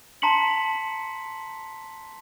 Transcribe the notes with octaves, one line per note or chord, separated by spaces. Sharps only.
A5 A#5 C6 B6 C#7 F#7